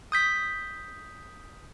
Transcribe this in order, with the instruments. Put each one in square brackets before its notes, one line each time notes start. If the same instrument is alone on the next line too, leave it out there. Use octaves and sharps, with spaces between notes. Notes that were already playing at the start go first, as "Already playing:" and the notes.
[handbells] D#6 G6 B6